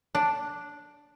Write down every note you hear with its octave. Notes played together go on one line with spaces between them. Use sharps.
D4